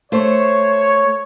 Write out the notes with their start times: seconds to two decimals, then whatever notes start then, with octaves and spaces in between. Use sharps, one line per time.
0.12 A3 C5 C#5